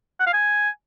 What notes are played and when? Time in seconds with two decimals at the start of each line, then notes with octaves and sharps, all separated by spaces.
0.20 F#5
0.27 F5
0.33 G#5